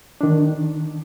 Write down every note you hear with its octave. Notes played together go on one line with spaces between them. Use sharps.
D#3 D4